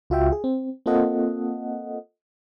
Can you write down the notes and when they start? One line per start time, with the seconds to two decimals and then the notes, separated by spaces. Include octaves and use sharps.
0.10 C#2 F4 F#4 E5 G5
0.32 G#4
0.44 C4
0.86 A#3 C4 F4 A4 D#5 F#5